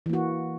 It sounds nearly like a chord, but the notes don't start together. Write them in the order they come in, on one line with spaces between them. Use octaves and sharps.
E3 A#3 F#4